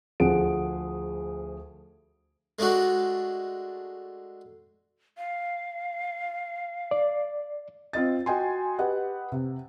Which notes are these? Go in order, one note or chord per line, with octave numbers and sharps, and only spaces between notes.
D2 F3 G#4 F#5 D7
G#3 A3 D4 F#4
F5
D5
C4 F4 D#5 A6
F#4 D#5 G5 G#5 C6
G4 B4 D#5 F#5
C3